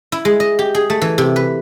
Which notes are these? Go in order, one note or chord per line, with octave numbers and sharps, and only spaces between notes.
E4
G#3
D#5
G4
G#4
A3
E3
C3
B4